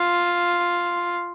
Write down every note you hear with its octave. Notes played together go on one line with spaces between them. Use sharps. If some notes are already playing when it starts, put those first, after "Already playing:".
Already playing: F4